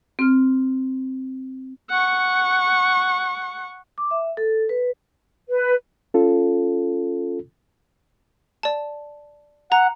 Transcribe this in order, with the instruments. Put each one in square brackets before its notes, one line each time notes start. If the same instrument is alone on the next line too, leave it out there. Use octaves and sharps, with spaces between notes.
[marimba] C4 F6
[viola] F#5 C#6
[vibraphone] D6
E5
A4
B4
[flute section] B4
[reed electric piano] C#4 F4 A4
[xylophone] D5 A5
[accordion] F#5 [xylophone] A#5